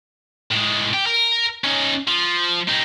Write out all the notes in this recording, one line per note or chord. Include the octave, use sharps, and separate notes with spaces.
A2 G#3
G4
A#4
C#4 D#4
F3
G3 D#4